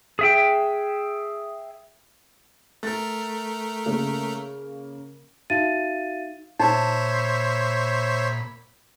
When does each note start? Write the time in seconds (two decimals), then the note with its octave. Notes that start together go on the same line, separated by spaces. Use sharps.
0.19 G#4 E5 G5
2.83 A3 A#4 A6
3.86 C#3 A#3
5.50 D#4 F#4 E5 F5 A6 D#7
6.59 A#2 D#4 C5 C#5 E5 B5